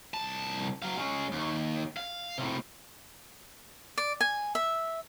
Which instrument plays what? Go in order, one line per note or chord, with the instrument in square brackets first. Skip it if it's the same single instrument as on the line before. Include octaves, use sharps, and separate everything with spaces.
[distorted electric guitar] C2 A5
F#3 F5
G#3 C#4
D#2
F5
A2 C3
[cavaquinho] D5
G#5
E5